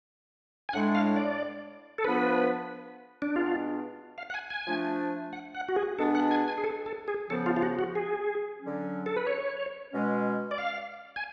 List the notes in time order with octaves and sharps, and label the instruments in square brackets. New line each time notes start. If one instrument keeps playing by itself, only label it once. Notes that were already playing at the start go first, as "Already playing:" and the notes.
[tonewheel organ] G#5
[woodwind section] A2 G#3 D4 [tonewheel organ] F#5
[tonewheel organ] F5
D5
A4
[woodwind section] F3 B3 D4 [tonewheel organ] B4
[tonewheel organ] D4
[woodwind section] B2 G#3 B3 D4 [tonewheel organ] F4
[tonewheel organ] F5
F#5
G#5
G#5
[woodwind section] F3 A3 D4
[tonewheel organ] F#5
F#5
F#4
G#4
[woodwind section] B2 G#3 B3 D4 [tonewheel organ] A4
[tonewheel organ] F#5
G#5
G#5
G#4
A4
A4
G#4
[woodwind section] C#3 F3 B3 [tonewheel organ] A4
[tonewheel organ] F4
F4
F#4
F#4
G#4
[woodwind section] D3 F#3 C#4
[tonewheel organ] A4
B4
C#5
[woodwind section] B2 G#3 C#4
[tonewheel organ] D5
F5
G#5